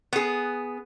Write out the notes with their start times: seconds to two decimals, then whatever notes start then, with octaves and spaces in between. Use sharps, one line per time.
0.13 B3 G#4